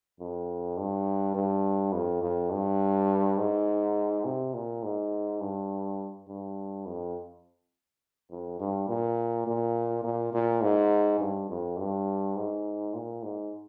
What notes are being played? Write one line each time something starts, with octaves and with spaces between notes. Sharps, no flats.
F2
G2
G2
F2
F2
G2
G#2
C3
A#2
G#2
G2
G2
F2
F2
G2
A#2
A#2
A#2
A#2
G#2
G2
F2
G2
G#2
A#2
G#2